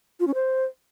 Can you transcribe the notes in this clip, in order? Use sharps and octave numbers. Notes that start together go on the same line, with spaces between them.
F4
C#4
C5